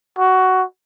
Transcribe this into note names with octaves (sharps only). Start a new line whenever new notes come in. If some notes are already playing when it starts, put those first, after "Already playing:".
F#4